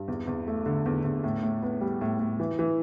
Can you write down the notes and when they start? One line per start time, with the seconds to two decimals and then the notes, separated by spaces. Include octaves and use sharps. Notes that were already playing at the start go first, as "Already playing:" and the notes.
Already playing: G2
0.08 E2
0.27 E2
0.47 A3
0.66 D3
0.86 E2
1.05 E2
1.23 A2
1.43 A2
1.62 B3
1.81 G3
2.01 A2
2.19 A2
2.40 E3
2.59 E3